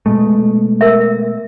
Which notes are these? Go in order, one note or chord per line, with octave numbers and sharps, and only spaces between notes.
B2 G#3 A3
A#4 E5